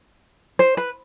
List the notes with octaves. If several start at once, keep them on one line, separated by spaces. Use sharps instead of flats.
C5
B4